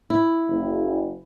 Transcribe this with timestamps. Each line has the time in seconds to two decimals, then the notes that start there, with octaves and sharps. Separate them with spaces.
0.10 E4
0.49 F#1